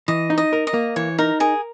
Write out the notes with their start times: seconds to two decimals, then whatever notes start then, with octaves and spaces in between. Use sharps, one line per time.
0.08 E3 D#5
0.30 D#4
0.38 D#5
0.53 A#4
0.67 D#5
0.74 A#3
0.96 E3 C#5
1.18 D#4 A#4
1.40 G#4 A#4